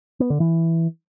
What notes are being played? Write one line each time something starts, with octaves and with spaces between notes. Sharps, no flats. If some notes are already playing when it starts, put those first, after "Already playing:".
B3
D3
E3